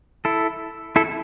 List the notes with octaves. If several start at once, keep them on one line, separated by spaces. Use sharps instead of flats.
E4 A4
E4 A4